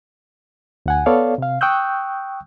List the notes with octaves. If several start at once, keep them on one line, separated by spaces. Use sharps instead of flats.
D2 F#5 G#5
B3 A4 C#5 D5 F5
C3 F5
G5 C#6 D#6 E6 F#6 G6